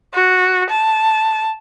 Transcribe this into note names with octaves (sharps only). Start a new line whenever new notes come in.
F#4
A5